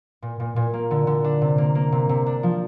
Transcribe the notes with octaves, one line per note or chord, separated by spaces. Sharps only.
A#2
A#2
A#2
A#3
D3
D3
D4
C3
A#3
A#3
C3
C3
D4
F3